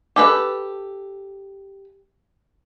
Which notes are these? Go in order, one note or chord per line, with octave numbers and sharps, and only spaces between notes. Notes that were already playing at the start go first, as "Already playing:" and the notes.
G4 A4 B4